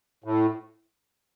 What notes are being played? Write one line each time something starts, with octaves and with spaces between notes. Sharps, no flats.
A2